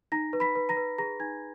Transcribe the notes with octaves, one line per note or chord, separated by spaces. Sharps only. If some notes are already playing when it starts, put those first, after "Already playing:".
D#4 A#5 A#6
B4
B5 B6
B4
A#5 A#6
B4
G#4 A#5 A#6
D#4 G#5 G#6